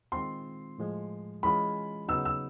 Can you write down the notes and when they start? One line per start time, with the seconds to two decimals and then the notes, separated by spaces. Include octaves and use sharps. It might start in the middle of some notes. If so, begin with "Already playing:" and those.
0.12 D#3 G#3 C4 F4 C6
0.78 A2 F3 G#3
1.43 E3 G#3 C#4 F4 B5
2.08 C#3 F#3 B3 D#4 E6
2.25 E6